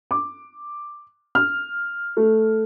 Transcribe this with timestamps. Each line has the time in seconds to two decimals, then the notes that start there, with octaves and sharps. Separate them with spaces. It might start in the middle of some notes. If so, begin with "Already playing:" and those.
0.11 D6
1.35 F6
2.17 A3